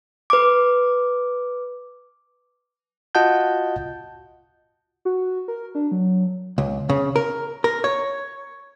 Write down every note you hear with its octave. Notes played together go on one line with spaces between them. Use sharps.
B4 D6
F4 F#4 D#5 F#5 A5 G6
F#4
A#4
D4
F#3
C#2
C#3
A#4
A#4
C#5